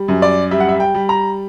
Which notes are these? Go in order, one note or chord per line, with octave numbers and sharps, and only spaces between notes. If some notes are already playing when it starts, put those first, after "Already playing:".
Already playing: G3
F#2
D5
G3 E5
F#5
E5
G5
G3
A#5